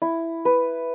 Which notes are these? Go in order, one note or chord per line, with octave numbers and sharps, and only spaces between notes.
E4
B4